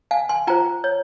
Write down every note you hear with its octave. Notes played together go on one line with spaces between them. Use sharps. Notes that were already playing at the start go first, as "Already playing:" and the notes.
F5 G#5
G#5 C6
F4 C5 G5 A#5
C#5